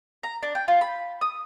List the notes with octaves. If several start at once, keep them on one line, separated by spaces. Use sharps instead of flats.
A#5
D4
G5
F4
B5
D#6